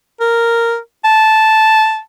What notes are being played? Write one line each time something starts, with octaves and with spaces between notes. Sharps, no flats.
A#4
A5